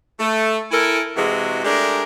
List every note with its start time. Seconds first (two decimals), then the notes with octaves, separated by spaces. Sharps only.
0.19 A3
0.71 E4 A4 A#4 G#5
1.16 C3 E3 G#3 F#4
1.64 G#3 A3 D4 G4 A#4